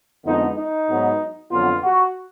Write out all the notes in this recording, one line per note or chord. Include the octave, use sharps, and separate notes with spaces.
F2 D3 G#3 B3 D#4
D#4
G#2 F#3 B3
F2 D3 F#3 B3 F4
F#4